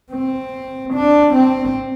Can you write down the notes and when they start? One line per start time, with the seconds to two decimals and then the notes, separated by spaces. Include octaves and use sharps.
0.12 C4
0.94 D4
1.35 C4